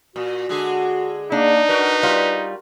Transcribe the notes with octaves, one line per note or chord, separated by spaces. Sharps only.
A#2 F#4
D3 G#3 G#4
A#3 D4 D#4
F#4 A#4 B4
G3 F4